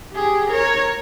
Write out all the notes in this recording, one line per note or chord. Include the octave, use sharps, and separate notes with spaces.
G4 G#4
A#4 C#5